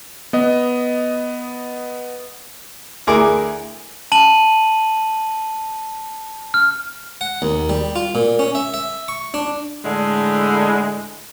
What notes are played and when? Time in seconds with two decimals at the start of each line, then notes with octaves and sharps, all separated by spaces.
0.33 B3 D#5
3.07 D2 E4 G#4 A#4 D6
4.12 A5 D#7 F#7
6.54 F6
7.21 F#5
7.42 D#2
7.69 G3
7.96 F4
8.15 A#2
8.39 C#4
8.55 E5
8.74 E5
9.08 C#6
9.34 D4
9.85 A2 D3 G#3